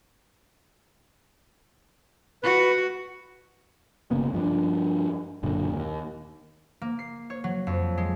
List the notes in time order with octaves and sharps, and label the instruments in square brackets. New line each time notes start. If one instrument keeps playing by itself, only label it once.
[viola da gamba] F#4 [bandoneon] B4
[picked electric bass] G1 C#3 A#3 B3
G2 F3 C#4 D4
F#1 F#2 A#2 D3
D#2
[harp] A#3
C7
C#5
F#3
F2
G#3